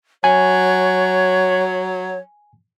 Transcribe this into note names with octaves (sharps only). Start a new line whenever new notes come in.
F#3 C#5 G#5